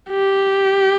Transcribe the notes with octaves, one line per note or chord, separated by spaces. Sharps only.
G4